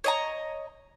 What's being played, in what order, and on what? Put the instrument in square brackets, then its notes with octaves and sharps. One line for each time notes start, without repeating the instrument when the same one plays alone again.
[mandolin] C#5 D#5 A#5